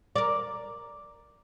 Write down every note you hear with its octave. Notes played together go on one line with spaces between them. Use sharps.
A#4 D5